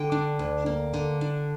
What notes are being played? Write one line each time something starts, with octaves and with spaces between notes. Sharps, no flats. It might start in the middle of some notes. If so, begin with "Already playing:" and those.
Already playing: D3 G5
D4
D2
A#3
D3
D4